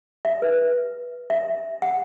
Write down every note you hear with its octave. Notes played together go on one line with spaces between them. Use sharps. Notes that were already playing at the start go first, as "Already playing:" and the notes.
E5
B4
E5
F#5